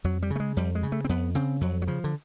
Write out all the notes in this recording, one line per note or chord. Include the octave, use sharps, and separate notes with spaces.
F2 F#3
G3
C#3
A3
G#3
F2 G3
G#3
C#3
A3
C4
F2 B3
C#3 C4
F2 F#3
F#3
C#3 F3
D3